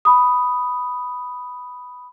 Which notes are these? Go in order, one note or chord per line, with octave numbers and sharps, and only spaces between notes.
B5 D#6